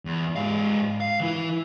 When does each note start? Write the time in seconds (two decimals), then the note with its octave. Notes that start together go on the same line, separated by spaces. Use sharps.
0.05 E2
0.36 G#2 F5
1.00 F5
1.20 E3 E4